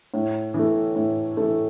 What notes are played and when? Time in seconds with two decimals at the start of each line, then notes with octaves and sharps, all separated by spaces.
0.14 A2
0.54 E3 A3
0.96 A2
1.37 E3 A3